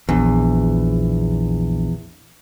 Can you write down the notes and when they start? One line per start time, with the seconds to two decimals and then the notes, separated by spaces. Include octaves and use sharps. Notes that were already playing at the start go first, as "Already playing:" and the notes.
0.09 A#1 E2